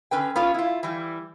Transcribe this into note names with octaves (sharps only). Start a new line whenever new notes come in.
D3 C#4 B4 G5
B3 C#4 F4
E4 F4
E3 G3